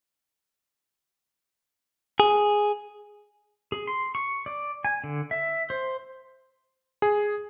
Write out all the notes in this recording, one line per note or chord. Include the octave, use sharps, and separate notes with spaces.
G#4
G#4
C6
C#6
D5
G#5
D3
E5
C5
G#4